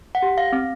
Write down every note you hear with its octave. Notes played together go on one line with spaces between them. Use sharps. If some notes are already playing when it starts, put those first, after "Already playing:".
F#5
G4
F5
C4